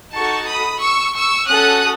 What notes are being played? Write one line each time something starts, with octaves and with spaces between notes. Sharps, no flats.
D#4 F#4 A4 A5 C#6
B5 D#6
C#6 E6
C#6 E6
C#4 F#4 A4 D#6 F#6